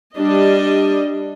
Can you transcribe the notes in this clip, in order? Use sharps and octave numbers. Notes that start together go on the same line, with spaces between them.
G3 D4 D#5